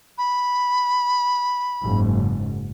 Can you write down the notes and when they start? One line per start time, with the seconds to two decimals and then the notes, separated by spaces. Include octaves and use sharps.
0.18 B5
1.84 F#1 G#2